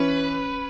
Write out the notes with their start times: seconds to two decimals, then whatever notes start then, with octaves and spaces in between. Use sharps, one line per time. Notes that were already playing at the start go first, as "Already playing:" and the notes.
Already playing: E3 C#4 B4